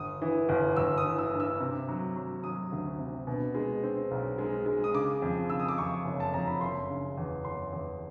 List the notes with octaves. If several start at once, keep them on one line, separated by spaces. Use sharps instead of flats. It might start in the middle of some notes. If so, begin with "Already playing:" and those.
Already playing: G1 D#6
E3
G1
G1 E6
D#6
E3
E6
G2
E6
C3
F#3
F#3
F#3 D#6
D2
C3
B2
G#3
C4
B1
G#3
G#3
D#6
C#3 D6
F2
C#3 E6
D#6
D6
F2 C#6
F#1
A5
F2 A#5
B5
F#1 C6
C#3
E2
F#1 C6
E2